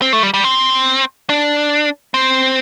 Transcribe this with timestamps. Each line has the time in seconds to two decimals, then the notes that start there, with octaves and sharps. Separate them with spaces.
0.02 C4
0.13 A3
0.23 G3
0.34 G3
0.44 C4
1.29 D4
2.14 C4